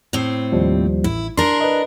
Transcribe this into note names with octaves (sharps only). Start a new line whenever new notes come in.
A2 C4
D#2 F3 G3
A1 E4
D4 A#4 C6
B4 D#5